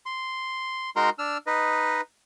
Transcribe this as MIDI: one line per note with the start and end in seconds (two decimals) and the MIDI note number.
0.06 0.90 84
0.96 1.10 56
0.96 1.10 63
0.96 1.10 66
0.96 1.10 70
0.96 1.10 82
0.96 1.10 84
1.19 1.38 62
1.19 1.38 88
1.19 1.38 89
1.47 2.01 63
1.47 2.01 71
1.47 2.01 75